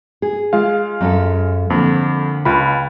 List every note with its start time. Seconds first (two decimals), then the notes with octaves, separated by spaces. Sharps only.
0.22 G#4
0.53 G#3 F4 F5
1.01 F#2 C#4 A4
1.70 F2 D3 A#3
2.45 C#2 F4 B5